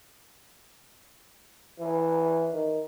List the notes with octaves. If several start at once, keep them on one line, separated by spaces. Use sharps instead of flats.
E3
D#3